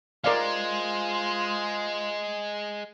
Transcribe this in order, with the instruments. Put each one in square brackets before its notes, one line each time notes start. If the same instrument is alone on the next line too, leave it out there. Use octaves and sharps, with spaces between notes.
[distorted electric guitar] G#3 [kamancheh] F4 C5 [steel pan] A#4 D5 F5